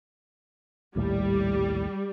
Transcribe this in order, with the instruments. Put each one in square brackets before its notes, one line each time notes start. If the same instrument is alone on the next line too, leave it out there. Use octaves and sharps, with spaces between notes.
[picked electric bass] A#1 D#2 A2 [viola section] G3